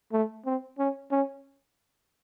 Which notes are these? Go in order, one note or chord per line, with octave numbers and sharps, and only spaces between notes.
A3
C4
C#4
C#4